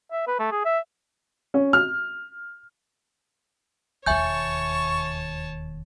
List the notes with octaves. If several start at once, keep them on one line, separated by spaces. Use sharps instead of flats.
E5
B4
A3
G#4
E5
C#4
F6
E1 D#2 C#5 E5 G#5 A5 C#6 G6